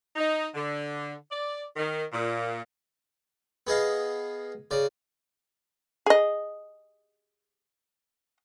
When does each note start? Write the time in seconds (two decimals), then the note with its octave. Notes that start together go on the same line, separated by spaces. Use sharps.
0.16 D#4
0.55 D3
1.30 D5
1.77 D#3
2.12 A#2
3.67 B3 G#4 D#5 F5
4.71 C#3 D5
6.06 G#4 D#5